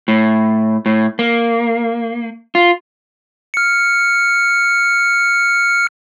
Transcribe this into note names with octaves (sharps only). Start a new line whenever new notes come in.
A2
A2
A#3
F4
F6 C#7